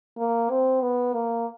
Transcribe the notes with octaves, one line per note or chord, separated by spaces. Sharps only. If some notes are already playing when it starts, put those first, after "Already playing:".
A#3
C4
B3
A#3